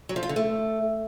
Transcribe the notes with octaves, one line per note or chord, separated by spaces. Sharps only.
F#3
F3
F4
D3
A3